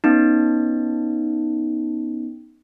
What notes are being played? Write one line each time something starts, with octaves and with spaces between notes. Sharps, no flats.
B3 C#4 D#4